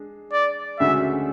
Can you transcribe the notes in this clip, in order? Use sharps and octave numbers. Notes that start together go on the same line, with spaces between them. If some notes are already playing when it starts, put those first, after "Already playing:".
Already playing: G#3 D4
D5
D2 C#3 G#3 D4 F#4 E5